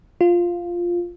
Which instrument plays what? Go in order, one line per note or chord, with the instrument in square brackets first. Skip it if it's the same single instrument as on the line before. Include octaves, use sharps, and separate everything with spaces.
[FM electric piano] F4